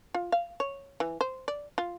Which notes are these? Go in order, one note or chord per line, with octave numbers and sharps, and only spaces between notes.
F4
F5
C#5
E3
C5
D5
F4